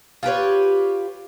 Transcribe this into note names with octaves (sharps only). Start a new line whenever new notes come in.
F4 G4 B4 C#5